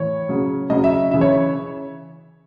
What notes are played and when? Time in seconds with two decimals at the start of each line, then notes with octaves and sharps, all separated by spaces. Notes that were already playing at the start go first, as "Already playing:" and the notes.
Already playing: A2 E3 C#5
0.29 C#3 F#3
0.70 C#3 F#3 D#5
0.84 E5
1.11 C#3 E3 E5
1.21 C#5